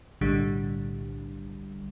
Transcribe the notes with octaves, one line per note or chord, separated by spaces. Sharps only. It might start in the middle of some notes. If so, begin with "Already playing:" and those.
B1 A2 D3 G3